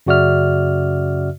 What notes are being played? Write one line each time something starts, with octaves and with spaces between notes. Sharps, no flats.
F#2 C#3 F#4 D5 E5 F6